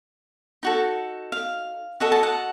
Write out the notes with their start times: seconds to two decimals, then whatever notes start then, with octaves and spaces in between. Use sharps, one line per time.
0.63 D#4 F#4 A4
1.32 F5
2.00 F#4 A4 D#5 F#5
2.12 A5
2.23 F#5